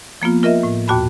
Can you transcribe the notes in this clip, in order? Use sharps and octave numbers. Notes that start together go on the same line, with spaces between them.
F3 A#3 B3 F4
F4 A#4 D#5 E5
A2
D#2 A#2 F#4 A5 B5